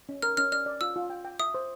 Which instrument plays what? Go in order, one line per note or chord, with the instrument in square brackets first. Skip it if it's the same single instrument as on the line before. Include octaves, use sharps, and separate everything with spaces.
[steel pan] C#4
[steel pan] A#4 [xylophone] F6
[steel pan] C#4 [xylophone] F6
[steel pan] D5 [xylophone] F6
[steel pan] D5
[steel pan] F4 [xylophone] E6
[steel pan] F4
G5
G5
[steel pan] E5 [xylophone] D#6
[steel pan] C5